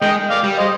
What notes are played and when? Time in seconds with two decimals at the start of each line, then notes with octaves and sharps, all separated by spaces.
0.02 G#3 D#5 G5
0.30 D5 F5
0.44 G3
0.59 C5 D#5